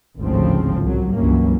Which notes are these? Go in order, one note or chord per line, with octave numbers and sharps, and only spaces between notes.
G#1 D2 A2 C#3 F3 C4
C2 F#3
C#2 G2 E3 F#3 A#3 C#4